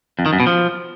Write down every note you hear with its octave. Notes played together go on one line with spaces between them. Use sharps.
F2
D#3
F#2
B2
F3